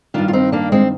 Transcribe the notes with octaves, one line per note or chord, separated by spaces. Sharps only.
G2 D#3 D4 F4
F4
C4 D#4
A#3 D4
G#3 C4